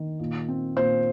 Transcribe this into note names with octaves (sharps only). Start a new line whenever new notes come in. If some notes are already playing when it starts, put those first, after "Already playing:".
Already playing: D#3
A#2
C4
A#2 C5